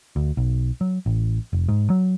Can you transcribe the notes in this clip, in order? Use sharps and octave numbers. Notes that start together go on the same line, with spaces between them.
D2
B1
F#3
A1
F1
G#2
F#3